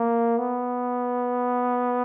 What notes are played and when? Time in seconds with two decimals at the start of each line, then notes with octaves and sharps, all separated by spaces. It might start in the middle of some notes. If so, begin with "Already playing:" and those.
Already playing: A#3
0.38 B3